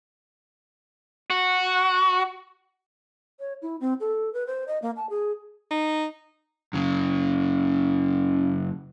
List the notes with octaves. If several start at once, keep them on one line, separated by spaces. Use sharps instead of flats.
F#4
C#5
E4
C4
A4
B4
C5
D#5
A#3
A5
G#4
D#4
F#2 C#3